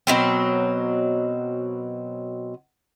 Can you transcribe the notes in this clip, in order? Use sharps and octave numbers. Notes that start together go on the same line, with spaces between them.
B2 F#3 C4